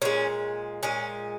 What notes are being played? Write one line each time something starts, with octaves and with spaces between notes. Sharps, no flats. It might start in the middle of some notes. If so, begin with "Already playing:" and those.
A#2 G#3 C#4
A#2 G#3 C#4